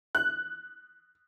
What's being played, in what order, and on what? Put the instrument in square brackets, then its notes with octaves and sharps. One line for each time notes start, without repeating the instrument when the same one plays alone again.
[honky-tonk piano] F#6